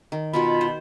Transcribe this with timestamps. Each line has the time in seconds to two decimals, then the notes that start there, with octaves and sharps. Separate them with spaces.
0.12 D#3
0.33 B2 D#3 F4 F#5 B5
0.61 C5